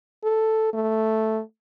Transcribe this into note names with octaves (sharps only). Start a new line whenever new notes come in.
A4
A3